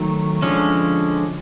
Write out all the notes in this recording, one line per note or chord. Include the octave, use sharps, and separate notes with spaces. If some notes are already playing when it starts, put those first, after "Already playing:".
Already playing: D#3 F#3 A3
D3 F3 G#3 C#4